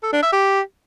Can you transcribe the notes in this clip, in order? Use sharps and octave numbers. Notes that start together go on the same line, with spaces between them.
A4
D4
E5
G4